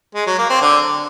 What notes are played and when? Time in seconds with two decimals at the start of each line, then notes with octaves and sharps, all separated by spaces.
0.15 G#3
0.27 F#3
0.38 A#3
0.50 C4
0.61 D3